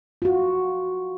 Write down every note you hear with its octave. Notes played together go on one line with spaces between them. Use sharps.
F4 F#4